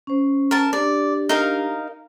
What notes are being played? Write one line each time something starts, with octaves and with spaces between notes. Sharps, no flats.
C#4 C5
A#4 A5
D4 G4 D5
D#4 A#4 F5